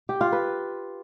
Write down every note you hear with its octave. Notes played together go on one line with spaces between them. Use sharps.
G4
F4
B4